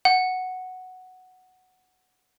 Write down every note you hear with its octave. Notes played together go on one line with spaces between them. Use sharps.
F#5